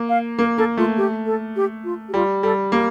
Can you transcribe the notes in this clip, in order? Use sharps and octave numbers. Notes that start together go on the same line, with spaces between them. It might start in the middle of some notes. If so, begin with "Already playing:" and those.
Already playing: A#3
F5
A#3 A#4
A#3 A4
A3 F4
G4
A4
G4
F4
G4
G3 F4
G3 A4
A#3 G4